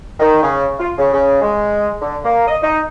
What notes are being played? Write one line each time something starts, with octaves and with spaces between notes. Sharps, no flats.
D#3
C#3
F4
C#3
C#3
G#3
D3
A#3
D#5
D#4